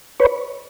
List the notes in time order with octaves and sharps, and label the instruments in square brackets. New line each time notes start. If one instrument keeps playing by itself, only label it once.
[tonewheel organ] B4 C#5